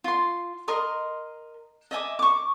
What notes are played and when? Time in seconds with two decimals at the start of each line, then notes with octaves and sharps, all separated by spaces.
0.04 F4 C6
0.68 A#4 D#5 C6
1.91 D#5 E5 G#5 D6
2.19 C#6 D6